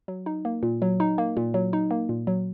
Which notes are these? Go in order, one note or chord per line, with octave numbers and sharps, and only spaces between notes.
F#3
D#4
A#3
A#2
F#3
D#4
A#3
A#2
F#3
D#4
A#3
A#2
F#3